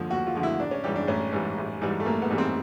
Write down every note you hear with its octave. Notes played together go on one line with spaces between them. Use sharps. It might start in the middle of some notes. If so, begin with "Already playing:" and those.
Already playing: D#2 D3 F3 G#3
D#2 F#4
F4
D3 F3 G#3
E4
A1 D4
C#4
G#2 E3 G3 G4
D4
A1 C#4
G#2 E3 G3
A1
G#2 E3 G3
A3
A1 A#3
B3
G#2 E3 G3
C4